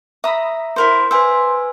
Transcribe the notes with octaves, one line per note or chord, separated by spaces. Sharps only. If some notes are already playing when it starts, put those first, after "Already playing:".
E5 A#5 B5 D#6
E4 A#4 C5
B4 C5 E5 G#5 E6